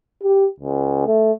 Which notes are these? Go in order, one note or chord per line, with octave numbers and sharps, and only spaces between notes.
G4
C#2
A3